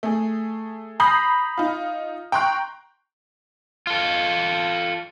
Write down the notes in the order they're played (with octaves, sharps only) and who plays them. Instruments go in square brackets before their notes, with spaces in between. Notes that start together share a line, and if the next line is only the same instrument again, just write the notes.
[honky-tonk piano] A3 G#4
A#5 B5 D#6 G6 A#6 C7
D#4 F4
G5 A#5 C6 C#6 F#6
[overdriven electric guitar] F4 A4